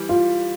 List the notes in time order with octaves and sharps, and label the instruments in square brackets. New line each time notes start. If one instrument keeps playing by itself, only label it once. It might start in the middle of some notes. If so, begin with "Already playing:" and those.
Already playing: [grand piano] E3 G3
[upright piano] F4